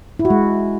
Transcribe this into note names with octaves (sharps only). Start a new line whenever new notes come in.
E4
F#4
G#3